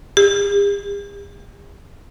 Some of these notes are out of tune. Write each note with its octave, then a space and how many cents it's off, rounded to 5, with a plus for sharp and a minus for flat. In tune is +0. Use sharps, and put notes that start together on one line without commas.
G#4 -45